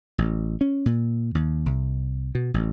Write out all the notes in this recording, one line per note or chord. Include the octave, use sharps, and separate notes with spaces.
A1
C#4
A#2
D#2
C2
B2
A1